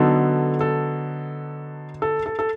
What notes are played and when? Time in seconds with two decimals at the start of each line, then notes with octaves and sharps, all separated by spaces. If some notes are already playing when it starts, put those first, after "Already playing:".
Already playing: D3 F#3 B3 D#4 A4
0.61 A4
2.02 A4
2.26 A4
2.39 A4